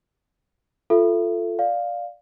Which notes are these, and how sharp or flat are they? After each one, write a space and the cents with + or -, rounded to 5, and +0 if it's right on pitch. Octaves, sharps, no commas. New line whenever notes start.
F4 +0 A4 +5 E5 +30
D5 +0 F5 +5